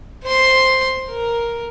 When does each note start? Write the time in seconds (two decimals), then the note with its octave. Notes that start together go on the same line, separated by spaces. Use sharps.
0.24 C5 C6
1.09 A#4